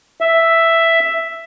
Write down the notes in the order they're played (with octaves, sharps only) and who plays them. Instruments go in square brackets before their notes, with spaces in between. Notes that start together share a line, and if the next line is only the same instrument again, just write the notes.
[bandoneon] E5